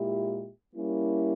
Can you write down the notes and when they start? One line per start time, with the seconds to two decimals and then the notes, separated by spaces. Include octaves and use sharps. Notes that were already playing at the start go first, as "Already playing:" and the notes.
Already playing: A#2 G#3 E4 G4
0.73 G3 A#3 C#4 E4